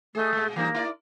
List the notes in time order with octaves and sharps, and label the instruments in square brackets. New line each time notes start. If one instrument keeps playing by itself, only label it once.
[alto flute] A3 [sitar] G#4 D#5
[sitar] A#2 G#3
[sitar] E3 G3 D#4 [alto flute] A#3
[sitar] E4 A#4 D5